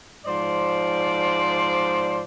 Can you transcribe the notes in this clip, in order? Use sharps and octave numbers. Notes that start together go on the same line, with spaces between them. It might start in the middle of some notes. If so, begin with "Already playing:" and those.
G#2 F3 C5 D5